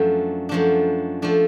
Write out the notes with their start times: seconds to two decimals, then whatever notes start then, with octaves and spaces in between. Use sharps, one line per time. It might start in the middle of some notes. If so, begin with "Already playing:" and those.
Already playing: F#2 F3 A3 D4
0.49 F#2 F3 A3 D4
1.22 F3 A3 D4